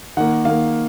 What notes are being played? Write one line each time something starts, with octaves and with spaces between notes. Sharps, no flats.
D#3 A#3 F#5
D#3 A#3 F5